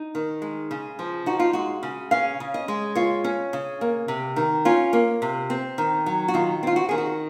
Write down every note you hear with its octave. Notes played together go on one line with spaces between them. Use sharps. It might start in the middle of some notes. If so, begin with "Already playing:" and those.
Already playing: D#4
D#3
G#3
C#3
F3
D#4 F#4
F4
G#3 F#4
C#3
C#4 F5
C#3
D#5
G#3
F4 C#5
C#4
C#3
A#3
C3
D#3
C#4 F4
A#3
C3
C4
D#3
F#3
F#4
D#3 F4
C4 F4
F#4
D#3 G#4
F#4